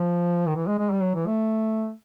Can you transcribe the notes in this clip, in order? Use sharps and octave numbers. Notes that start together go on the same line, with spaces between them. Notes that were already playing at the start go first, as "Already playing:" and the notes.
Already playing: F3
D#3
E3
G#3
G#3
G3
F#3
E3
A3